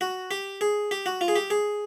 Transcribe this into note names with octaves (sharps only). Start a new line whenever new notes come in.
F#4
G4
G#4
G4
F#4
F4
G#4
G4
G#4